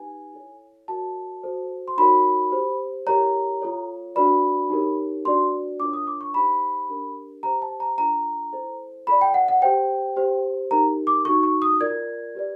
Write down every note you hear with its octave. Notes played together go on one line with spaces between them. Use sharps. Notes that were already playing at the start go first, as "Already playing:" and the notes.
Already playing: D#4 G4 B4 G#5
E4 A4 C#5
F#4 A#4 C#5 A5
F#4 A4 C5
C6
D#4 F#4 A#4 C#5 B5
G4 C5
E4 G4 A#4 C#5 A#5
F4 A4 C#5
D4 F#4 B4 D5 B5
D#4 G4 A#4 C#5
D4 F#4 B4 D5 C6
D4 F4 A#4 C#5 D6
D#6
D6
C#6
D#4 G4 C5 B5
D4 G4 A#4
G4 C5 A#5
A5
A#5
D4 F4 A4 A#5
E4 A4 C5
F4 A4 D5 B5
G5
F#5
F#5
G4 C5 G5
G4 C5
D#4 G4 A#4 A#5
D6
D#4 F#4 A4 C#6
C#6
D#6
F4 A#4 D5 G#6
G4 B4 D5